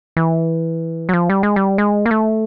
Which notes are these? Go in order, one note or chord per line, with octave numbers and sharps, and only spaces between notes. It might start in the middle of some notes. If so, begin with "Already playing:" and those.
E3
F#3
F3
G3
G#3
G3
G#3
A#3
A3